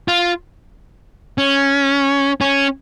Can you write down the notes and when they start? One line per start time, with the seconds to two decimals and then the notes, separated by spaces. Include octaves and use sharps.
0.08 F4
1.38 C#4
2.41 C#4